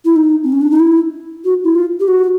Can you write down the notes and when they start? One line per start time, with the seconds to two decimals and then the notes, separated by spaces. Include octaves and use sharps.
0.05 E4
0.16 D#4
0.44 C4
0.52 C#4
0.61 D4
0.71 D#4
0.80 E4
1.45 F#4
1.64 E4
1.76 F4
2.00 G4
2.08 F#4